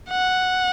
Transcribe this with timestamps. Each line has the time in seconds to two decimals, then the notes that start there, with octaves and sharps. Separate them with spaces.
0.10 F#5